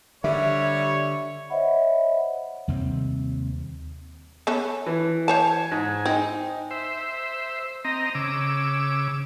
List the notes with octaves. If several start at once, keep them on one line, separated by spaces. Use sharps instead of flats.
D3 G3 C#5 E5
C5 C#5 D#5 E5 F#5 B5
D#2 C3 G3 C4
B3 C#4 A4
E3
C5 C#5 G#5 A5
G#2
C4 D#4
C5 E5
C4 D#5 A#5
C#3 D6 E6